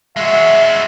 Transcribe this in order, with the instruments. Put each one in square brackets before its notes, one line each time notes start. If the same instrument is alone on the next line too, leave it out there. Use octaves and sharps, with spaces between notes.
[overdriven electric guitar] G#3 F#4 [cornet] E5